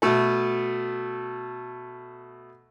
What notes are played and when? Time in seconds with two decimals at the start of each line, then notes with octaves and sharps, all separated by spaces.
0.02 B2 A3 A4